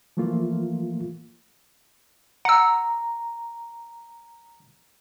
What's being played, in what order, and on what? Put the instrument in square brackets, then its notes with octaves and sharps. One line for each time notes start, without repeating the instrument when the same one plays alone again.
[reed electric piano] E3 F3 A3 A#3 F4
[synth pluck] F#5 E6 [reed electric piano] A#5